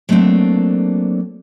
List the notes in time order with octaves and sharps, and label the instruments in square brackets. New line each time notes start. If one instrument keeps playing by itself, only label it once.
[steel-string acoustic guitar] F#3 A3 A#3 C4 D4